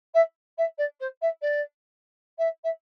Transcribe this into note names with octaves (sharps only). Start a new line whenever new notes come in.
E5
E5
D5
C5
E5
D5
E5
E5